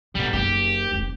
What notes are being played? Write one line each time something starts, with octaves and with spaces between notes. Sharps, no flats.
G2 A#2 G3 B3
F#1 D#4 G4
F1 D#4